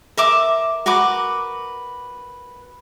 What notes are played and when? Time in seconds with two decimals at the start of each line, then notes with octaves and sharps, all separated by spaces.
0.17 A#4 E5 D6
0.86 F#4 A#4 B4 D6